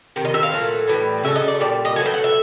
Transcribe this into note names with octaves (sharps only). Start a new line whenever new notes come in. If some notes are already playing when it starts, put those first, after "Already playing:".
C3 D#3
D#5
E5
F5
A#2 F#3 A3
A2 E3 G3
C#3 F#3 A3 E5
D#5
D5
A#2 G3 D5
D#5
B2 F#3 A3 G#5
G5
F#5
E5